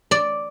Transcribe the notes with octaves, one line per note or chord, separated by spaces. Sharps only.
D5